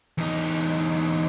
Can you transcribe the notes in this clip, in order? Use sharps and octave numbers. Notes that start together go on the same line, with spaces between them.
E2 D#4